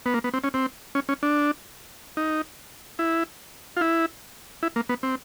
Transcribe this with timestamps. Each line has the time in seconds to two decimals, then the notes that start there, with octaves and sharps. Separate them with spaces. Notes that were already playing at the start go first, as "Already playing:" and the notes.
0.06 B3
0.14 A#3
0.24 B3
0.34 C4
0.44 C#4
0.54 C4
0.95 C#4
1.09 C#4
1.23 D4
2.17 D#4
2.99 E4
3.77 F4
3.81 E4
4.63 E4
4.76 A#3
4.89 B3
5.03 C4